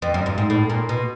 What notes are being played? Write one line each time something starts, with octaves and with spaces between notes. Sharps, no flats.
F2
F#2
G2
G#2
A2
A#2
B2